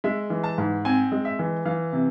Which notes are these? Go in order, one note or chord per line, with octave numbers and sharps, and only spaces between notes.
G#3 E5
E3
A5
G#2
C4 G#5
G#3
E5
E3
E3 F5
C3